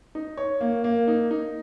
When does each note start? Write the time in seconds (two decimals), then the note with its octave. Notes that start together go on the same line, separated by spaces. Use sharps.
0.15 D#4
0.37 C#5
0.61 A#3
0.84 A#3
1.08 D#4
1.31 D#4